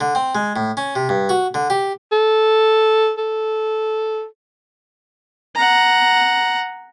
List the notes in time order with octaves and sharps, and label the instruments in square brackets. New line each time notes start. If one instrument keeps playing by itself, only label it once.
[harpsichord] D3
C4
G#3
A2
C#4
C3
G2
F#4
D3
G4
[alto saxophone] A4
A4
[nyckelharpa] F#5 A#5